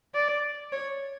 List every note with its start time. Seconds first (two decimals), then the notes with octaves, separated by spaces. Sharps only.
0.15 D5
0.72 C#5